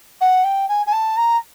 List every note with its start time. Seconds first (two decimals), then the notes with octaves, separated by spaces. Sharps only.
0.21 F#5
0.44 G5
0.68 G#5
0.86 G#5
0.93 A5
1.17 A#5